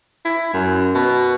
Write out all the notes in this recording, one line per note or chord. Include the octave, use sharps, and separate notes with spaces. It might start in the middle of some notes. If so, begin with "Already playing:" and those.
E4
F#2
B2